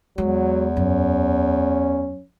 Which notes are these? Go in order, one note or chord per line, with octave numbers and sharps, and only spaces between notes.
E2 F#3 G#3
F#2 C#4